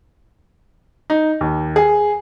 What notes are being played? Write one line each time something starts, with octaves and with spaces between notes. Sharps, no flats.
D#4
D#2
G#4